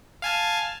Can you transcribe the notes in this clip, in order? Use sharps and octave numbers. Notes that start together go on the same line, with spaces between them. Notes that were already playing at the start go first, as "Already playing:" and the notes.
F5 G#5 A5